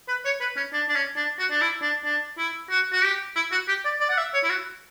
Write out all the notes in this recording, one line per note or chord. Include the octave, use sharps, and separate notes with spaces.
B4
C#5
B4
C#4
D4
D4
C#4
D4
F#4
D4
E4
D4
D4
E4
F#4
F#4
G4
E4
F#4
G4
D5
D5
F#5
E5
C#5
E4
F#4